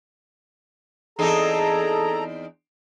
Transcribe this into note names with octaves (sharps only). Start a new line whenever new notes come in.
E2 C4 D#4 G#4 A4 A#5